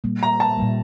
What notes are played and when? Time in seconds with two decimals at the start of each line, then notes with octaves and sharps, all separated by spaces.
0.04 A#2 G3 A#3
0.23 A#5
0.40 A5
0.58 A#2 G3 A#3